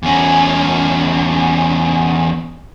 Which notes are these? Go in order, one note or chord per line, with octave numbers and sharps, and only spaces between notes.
E2 C#4